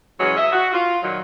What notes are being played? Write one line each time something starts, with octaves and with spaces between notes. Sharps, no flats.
C#3 E3 F#3 G#3 C#4
D#5 E5
F#4
F4
A#2 D#3 F#3